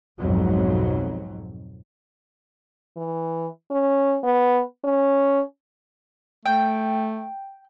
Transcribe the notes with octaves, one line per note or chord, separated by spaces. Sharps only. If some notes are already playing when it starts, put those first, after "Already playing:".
B1 F2 G#2 B2 F#3
E3
C#4
B3
C#4
A3 G5